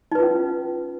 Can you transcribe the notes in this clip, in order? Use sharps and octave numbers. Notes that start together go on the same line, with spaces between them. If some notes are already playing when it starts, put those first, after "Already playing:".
C#4 D#4 F4 B4